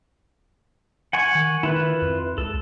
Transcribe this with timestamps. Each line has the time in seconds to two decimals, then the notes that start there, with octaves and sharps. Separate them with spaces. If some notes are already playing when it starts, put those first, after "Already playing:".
1.13 F#5 G#5 C#6
1.35 D#3
1.63 D#3 E4 F4 B4
2.02 F2
2.38 C#2 A4